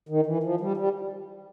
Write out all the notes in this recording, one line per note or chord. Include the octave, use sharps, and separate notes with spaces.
D#3
E3
F3
G3
G3